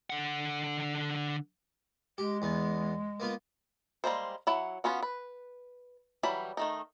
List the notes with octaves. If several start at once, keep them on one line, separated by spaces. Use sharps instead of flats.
D3 F#5
G#3 G4
E2 B3
A#3 B3 F4
G3 G#3 A#3 C5
F#3 E4 F#5
B3 C#4 F4 F#4
B4
E3 F#3 G3 B5
D#3 A3 D#4